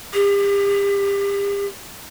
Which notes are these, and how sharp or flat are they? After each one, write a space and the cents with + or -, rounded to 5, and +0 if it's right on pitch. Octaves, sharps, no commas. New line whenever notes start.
G4 +35